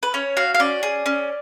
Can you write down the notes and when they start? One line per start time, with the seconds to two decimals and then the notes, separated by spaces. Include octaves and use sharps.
0.03 B4
0.14 C#4 C#5
0.37 F#4 F5
0.55 F5
0.60 C#4 D5
0.83 G#4
1.06 C#4